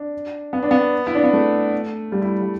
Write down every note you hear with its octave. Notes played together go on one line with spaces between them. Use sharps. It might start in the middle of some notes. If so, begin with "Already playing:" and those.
Already playing: D4
B3
D4
B3
E4
D4
B3
A3
G3
E4
G3